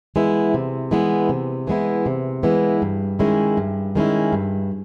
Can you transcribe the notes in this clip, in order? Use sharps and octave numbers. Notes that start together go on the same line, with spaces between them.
E3 G#3 B3 E4
C3
E3 G#3 B3 E4
C3
E3 G#3 B3 E4
C3
E3 G#3 B3 E4
G2
D#3 G#3 C#4 E4
G2
D#3 G#3 C#4 E4
G2